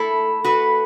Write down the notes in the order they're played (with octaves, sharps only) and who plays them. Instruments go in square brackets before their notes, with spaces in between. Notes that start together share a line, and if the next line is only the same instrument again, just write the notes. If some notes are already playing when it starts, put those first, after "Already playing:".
Already playing: [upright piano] A3 [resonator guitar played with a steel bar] E4 A4
[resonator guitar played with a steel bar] F#4 B4